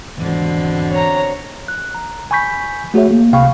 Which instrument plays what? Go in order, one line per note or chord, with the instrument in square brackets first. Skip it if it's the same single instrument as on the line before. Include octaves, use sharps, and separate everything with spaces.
[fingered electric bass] G#1 E2 [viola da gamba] B2 D3 C4
[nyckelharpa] C#5 A#5
[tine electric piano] F#6
A#5
G#5 B5 C#6 G6 B6
A3 F#4 G#4 C#5 E5
A#3
C#2 C3 F5 G5 B5 C#6